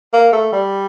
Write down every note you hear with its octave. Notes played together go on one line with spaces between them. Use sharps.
A#3
A3
G3